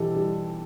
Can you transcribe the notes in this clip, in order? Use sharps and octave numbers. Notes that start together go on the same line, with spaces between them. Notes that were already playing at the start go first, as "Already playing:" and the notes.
Already playing: B1 E3 G3 G4 A4
G3